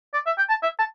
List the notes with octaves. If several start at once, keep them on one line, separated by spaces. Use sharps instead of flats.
D5
E5
G5
A5
E5
A5